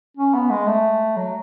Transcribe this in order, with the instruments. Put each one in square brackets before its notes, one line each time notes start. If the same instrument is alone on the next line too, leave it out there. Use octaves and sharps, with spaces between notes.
[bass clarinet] C#4
B3
G#3
A3
F#3